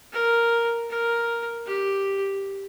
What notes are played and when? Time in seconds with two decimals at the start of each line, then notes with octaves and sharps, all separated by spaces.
0.12 A#4
0.90 A#4
1.66 G4